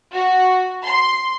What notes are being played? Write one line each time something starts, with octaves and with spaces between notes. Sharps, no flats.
F#4
C6